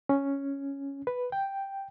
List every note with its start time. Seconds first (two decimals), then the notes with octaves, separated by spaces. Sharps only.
0.09 C#4
1.07 B4
1.32 G5